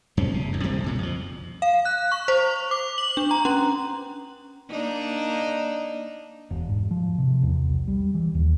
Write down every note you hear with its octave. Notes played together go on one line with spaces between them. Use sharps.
E2 G2 C4 C#4
F#1 C3
C2 F#2
D#1 C3 G3 C4
C2 A#2 C#3
F2 F3
F5
F#6
C#6
C5
D6
F#7
D4
A#5
C#4
A#3 D4 D#4
E1
G#2
F3
C3
E2
B1
G3
E3
D#2